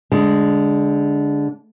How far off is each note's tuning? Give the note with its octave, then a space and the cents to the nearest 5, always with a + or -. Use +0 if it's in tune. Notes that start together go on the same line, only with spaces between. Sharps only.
D3 -15 G#3 +0